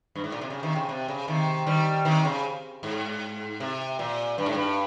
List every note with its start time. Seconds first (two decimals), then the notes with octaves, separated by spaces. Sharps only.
0.15 G2
0.24 G#2
0.32 A#2
0.41 C3
0.50 C#3
0.63 C3 D#3
0.75 C#3
0.89 C3
1.08 C#3
1.28 C3 D#3
1.66 D#3 G3
2.05 C3 D#3
2.25 C#3
2.83 G#2
3.60 C3
3.99 A#2
4.38 G2
4.46 G#2
4.55 G2